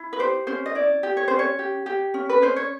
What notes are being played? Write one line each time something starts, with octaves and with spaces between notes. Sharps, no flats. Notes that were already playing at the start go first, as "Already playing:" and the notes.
Already playing: E4
B4
G4 C5
C#4 C5
D#5
E4 D5
G4
C#5
C#4 C5
C#5
G4
G4
C#4
B4
C#4 C5
C#5